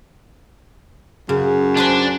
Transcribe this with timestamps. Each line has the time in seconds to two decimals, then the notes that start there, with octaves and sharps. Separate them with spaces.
1.29 F#2 C#3
1.77 D4 B4 C5 G#5